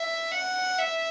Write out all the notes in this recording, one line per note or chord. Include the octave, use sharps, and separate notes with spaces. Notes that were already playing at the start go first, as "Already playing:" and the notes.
Already playing: E5
F#5
E5